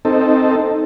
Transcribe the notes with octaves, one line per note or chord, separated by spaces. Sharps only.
C4 D#4 A4